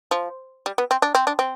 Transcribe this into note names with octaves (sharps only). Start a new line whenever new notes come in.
F3
G3
B3
C4
D4
C4
D4
C4